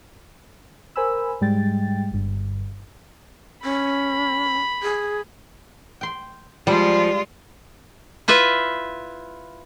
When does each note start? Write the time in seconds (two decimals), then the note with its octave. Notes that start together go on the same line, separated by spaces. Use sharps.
0.96 A#4 C5 G#5 B5 E6
1.41 G#2 G3 G#3 G5 A6
2.11 G1 G2
3.64 C#4 B5
4.83 G#4
6.01 G5 C6
6.67 F3 G3 G#3 F4
8.28 E4 F4 B4 E5